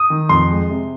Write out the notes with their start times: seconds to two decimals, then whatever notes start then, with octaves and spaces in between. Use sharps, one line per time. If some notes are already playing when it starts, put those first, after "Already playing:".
Already playing: D#6
0.10 D#3
0.29 F2 C6
0.50 G#3
0.70 C3